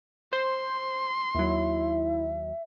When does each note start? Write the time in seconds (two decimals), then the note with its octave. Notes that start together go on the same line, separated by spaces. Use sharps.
0.33 C5 C6
1.34 D#2 F#3 E4 E5